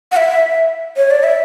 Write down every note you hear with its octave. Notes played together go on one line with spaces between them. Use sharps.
F#5
E5
C#5
D5
E5